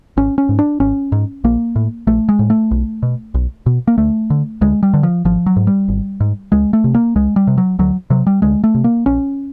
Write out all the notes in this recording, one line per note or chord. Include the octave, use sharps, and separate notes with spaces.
G#1 C#4
C#4
G#2
D4
G#1 C#4
G#2
A#1 A#3
A2
A#1 A3
G#3
A2
A3
B1
B2
B1
B2
A#3
D2 A3
D3
D2 G#3
G3
D3
F3
G#1 F3
F#3
G#2
G3
G#1
G#2
C#2 G#3
A3
C3
A#3
C#2 G#3
G3
C3
F#3
D2 F#3
C3 F#3
G3
D2 G#3
A3
C3
A#3
A#1 C#4